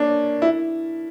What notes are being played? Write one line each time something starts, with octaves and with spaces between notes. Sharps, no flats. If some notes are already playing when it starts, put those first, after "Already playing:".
Already playing: A#3 C#4 D4
E4